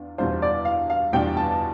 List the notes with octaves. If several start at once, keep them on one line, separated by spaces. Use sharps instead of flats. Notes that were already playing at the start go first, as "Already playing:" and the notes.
Already playing: E2 D4 F4
E2 B2 G3 D4 F4 C5
D5
F5
F5
E2 B2 G3 D4 F4 G5
A5